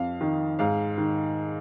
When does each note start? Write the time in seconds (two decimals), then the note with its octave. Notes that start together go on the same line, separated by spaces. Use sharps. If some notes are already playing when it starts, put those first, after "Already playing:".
Already playing: F2 F5
0.21 D#3
0.59 G#2 F5
0.98 D#3